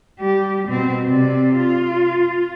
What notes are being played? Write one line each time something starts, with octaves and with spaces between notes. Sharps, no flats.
G3 G4
B2 C4
C3 D5
F4